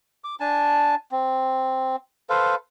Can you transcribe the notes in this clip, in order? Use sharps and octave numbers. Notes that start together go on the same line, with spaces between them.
D6
D4 G#5 A5
C4
A4 B4 C5 F5